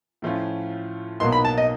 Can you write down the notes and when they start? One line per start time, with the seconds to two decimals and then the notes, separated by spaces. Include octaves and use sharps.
0.22 A2 F3 A3 C#4 F4
1.20 B1 B2 F#3 A#3 D#4 C6
1.32 B5
1.45 A5
1.58 D#5